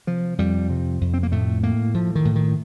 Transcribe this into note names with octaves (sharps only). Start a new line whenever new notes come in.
C3 F3
F2 G3
C3
F2
C4
A#3
A2 A3
A2 A#3
A2 F3
D#3
A2
D#3